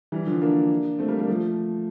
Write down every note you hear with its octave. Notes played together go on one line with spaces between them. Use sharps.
E3 G3
D3 F3
A#3 D4
A3 C4
G3 A#3
G3 A#3
F3 A3